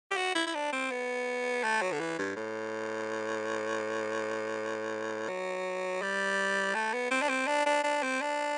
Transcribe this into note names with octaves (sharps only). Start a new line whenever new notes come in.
G4
F#4
E4
E4
D4
C4
B3
A3
F#3
D3
E3
G2
A2
F#3
G3
A3
B3
C4
D4
C4
D4
D4
D4
C4
D4